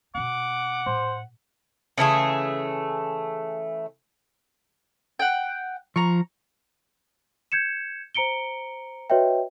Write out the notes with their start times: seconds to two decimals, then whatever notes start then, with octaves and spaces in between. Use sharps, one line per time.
0.15 B2 C4 F#5 D6
0.86 A2 C5
1.98 C#3 E3 A3 G#4
5.19 F#5 G5
5.96 F3 A#5 C#6
7.52 G6 G#6 C#7 E7
8.15 C5 A#5 C#7 D7 G7
9.10 F#4 B4 C#5 D#5 E5 G5